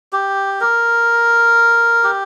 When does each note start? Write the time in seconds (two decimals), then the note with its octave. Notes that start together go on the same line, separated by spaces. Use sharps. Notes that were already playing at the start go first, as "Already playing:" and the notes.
0.13 G4
0.61 A#4
2.04 G4